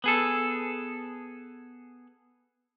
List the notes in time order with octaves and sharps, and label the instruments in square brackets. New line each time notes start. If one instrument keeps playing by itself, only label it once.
[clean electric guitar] B3 G#4 A4